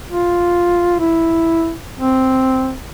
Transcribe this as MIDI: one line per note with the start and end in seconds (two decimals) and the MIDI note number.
0.09 0.95 65
0.99 1.72 64
1.97 2.75 60